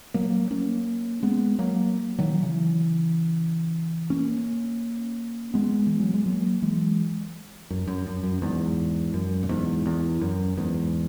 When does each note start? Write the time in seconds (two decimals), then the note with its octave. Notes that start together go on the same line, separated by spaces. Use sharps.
0.14 F#3 A#3
0.51 A#3 C#4
1.23 G#3 B3
1.59 F#3 A#3
2.19 D#3 F#3
2.42 C#3 E3
4.10 A#3 C#4
5.54 G#3 B3
5.87 E3
6.00 F#3
6.14 G#3
6.26 F#3 A#3
6.62 E3 G#3
7.70 F#2
7.87 F#2
8.07 F#2
8.23 F#2
8.42 E2 G#2
9.14 F#2
9.43 A#2
9.49 E2 G#2
9.86 E2
10.21 F#2
10.57 E2 G#2